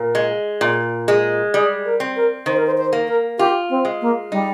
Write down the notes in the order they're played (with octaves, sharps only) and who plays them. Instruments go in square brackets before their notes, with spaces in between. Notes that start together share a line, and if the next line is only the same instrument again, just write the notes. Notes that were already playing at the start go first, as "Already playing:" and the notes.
Already playing: [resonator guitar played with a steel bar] A#2 [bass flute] A#4
[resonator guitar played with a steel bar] G#3
A#2
G#3
[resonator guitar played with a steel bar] G3 [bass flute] G#4
[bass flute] A#4
[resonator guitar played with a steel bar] C4
[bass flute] A#4
[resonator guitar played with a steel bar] D#3 [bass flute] C5
[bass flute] A#4
C5
C5
[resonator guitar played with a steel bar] A#3
[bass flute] A#4
[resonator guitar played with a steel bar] F4 [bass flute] G4
[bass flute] C4
[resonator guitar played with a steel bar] G#3
[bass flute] A#3
[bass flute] G3 [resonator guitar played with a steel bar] D#4